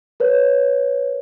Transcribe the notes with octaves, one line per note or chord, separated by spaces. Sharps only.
A#4 B4 C#5